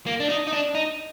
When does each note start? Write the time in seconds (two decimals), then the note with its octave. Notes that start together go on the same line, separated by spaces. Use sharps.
0.07 A#3
0.20 D4
0.29 D#4
0.47 D#4
0.52 D4
0.75 D#4